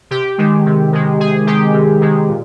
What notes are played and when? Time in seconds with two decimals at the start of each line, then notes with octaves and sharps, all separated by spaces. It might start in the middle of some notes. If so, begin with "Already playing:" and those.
0.11 C3 G4
0.38 D#3 G#3
0.66 C3
0.93 D#3 G#3
1.20 C3 G#4
1.47 D#3 G#3 G4
1.74 C3
2.01 D#3 G#3
2.29 A#2